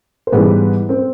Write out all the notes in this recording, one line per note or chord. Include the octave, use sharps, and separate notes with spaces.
C5
G#2 E3 G3 B3 B4
C4 C5